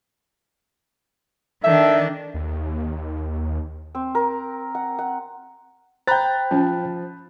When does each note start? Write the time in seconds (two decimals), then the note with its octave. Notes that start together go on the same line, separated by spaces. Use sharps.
1.64 D#3 D4 A4 E5 G5
2.34 D#2
3.95 C4
4.15 A#4
4.75 F#5
4.99 F#5
6.07 C5 G5 A#5 B5 F#6 G6 A6
6.51 F3 C#4